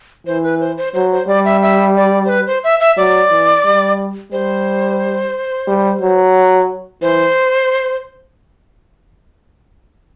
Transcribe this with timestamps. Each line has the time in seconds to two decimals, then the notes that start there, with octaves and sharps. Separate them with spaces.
0.26 E3 C5
0.43 B4
0.60 C5
0.77 C5
0.94 F#3 C5
1.12 C5
1.28 G3 D5
1.45 E5
1.62 E5
1.96 D5
2.25 C5
2.29 B4
2.47 C5
2.64 E5
2.80 E5
2.97 F#3 D5
3.31 E3
3.65 G3
4.32 G3 C5
5.67 G3
6.01 F#3
7.02 E3 C5